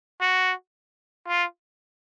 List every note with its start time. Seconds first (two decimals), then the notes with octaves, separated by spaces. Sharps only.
0.21 F#4
1.28 F4